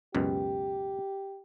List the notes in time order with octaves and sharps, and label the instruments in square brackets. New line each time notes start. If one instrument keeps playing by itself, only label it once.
[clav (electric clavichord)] C#2 F#2 B2 [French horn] G4